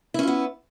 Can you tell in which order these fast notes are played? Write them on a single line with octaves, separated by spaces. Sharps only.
E4 C#4 F4 B3